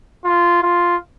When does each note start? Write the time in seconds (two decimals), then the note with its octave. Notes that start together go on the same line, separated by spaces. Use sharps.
0.25 F4
0.62 F4